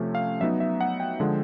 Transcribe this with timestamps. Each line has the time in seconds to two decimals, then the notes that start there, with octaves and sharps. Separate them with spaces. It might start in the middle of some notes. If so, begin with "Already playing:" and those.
Already playing: C3 F3 A3 C#4
0.15 F5
0.41 F#3 B3 D#4 E5
0.60 E5
0.81 F#5
1.00 G5
1.20 D3 F3 G#3